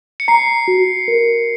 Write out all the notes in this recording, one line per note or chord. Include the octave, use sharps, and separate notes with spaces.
C#7
A#5 C7
F#4
A#4